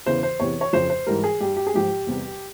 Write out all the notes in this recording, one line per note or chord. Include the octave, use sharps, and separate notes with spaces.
E2 C#3 E3 C5
C5
E2 C3 E3 C#5
C#5
F2 C#3 F3 C5
C5
G#2 E3 G3 A#4
G#4
G2 G3 G4
G4
G#4
G#2 F3 G4
E2 C3 G3